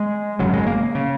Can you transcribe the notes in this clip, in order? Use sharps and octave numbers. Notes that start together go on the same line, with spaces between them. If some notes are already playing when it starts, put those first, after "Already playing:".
Already playing: G#3
G#1 F#2 C#3 F#3
G#3
A#3
C#3